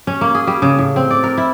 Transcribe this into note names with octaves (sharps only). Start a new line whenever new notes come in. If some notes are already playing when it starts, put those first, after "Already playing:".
C#4
A#3
G#4
G3
C#3
A2
C4
D5
A#4
E4